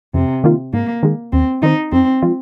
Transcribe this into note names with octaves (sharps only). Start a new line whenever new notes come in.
F2 C3
D#3 A#3 F4
G#2 A#3
D#3 G#3
D#2 C4
D#3 C4 D#4
F2 C4
F3 G#3 F4